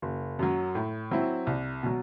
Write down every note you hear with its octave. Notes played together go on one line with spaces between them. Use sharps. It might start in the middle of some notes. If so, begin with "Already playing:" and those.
F#1
F#2 F#3
A2
F#3 C4 E4
C2
B2 F#3